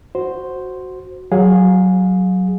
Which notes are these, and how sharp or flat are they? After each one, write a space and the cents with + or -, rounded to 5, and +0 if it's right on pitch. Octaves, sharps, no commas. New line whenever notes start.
F#4 +0 C5 +0
F#3 +5 G#4 +0 F5 +30